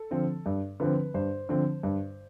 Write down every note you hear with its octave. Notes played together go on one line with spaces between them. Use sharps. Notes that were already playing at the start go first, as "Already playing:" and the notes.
Already playing: A4
D3 F3 C4
G2
D3 F3 C4 B4
G2 C5
D3 F3 C4
G2